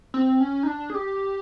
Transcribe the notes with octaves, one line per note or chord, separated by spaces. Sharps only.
C4
C#4
D#4
D4
G#4
G4